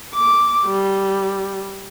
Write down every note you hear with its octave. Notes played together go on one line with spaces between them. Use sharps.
D6
G3